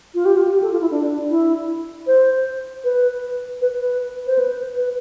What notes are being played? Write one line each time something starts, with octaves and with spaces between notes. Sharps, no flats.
F4
G4
F4
G4
A4
F4
E4
D4
E4
C5
B4
B4
B4
C5
B4
B4